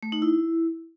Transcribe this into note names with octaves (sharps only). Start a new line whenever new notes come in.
A3
D#4
E4